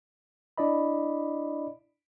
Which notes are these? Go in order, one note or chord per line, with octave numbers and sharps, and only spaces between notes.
D4 E4 D5 D#5 B5